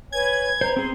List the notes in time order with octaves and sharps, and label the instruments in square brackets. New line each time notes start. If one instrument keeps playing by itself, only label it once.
[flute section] B4 C#5 G#5 [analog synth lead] G#6
[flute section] B4 A#5 [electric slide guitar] C5
[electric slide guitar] C4 G#4 [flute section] C6